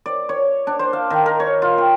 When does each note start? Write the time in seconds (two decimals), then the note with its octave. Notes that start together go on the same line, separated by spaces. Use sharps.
0.06 D5
0.29 C#5
0.67 D4
0.79 C5
0.93 F5
1.10 D#3
1.26 A#4
1.40 C#5
1.62 F4
1.78 G5